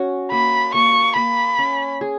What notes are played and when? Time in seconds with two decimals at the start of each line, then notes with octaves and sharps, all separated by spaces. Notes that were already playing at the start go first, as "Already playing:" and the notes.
Already playing: C#4 F#4
0.31 A#3 B5
0.74 A#3 C#6
1.16 A#3 B5
1.59 C#4
2.01 G#4